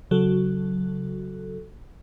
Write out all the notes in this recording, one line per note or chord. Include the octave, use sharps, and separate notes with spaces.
C#3 F#3 F#4 A4